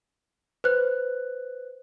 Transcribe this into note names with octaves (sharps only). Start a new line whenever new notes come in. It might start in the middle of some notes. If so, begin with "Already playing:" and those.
B4 C5 F#6